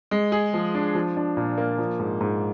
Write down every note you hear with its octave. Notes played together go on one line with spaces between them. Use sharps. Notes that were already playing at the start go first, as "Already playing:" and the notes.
G#3
G#4
F3
D4
F3
D4
A#2
A#3
F3
G#2
G#2